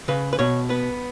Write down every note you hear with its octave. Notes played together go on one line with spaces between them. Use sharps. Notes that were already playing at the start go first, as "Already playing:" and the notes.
C#3 B4
B4
B2 C#5
B3 B4